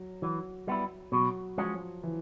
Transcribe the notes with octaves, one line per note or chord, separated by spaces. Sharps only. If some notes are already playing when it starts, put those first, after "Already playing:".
Already playing: F#3
E3 F#3
G3 B3 E4
B2 F#3
F3 G#3 C#4 F#4
E3